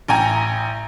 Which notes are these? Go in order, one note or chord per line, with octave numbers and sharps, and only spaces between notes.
A1 G5 G#5 A#5